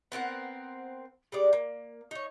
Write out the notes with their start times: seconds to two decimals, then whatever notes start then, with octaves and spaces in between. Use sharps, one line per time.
0.12 B3 C4 A#4 F#5
1.32 G3 G#3 D5
1.53 A#3
2.11 D#4 C#5